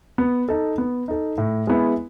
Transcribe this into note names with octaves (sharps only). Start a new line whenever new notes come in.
B3
D#4 A4
B3
D#4 A4
A2
G#3 B3 E4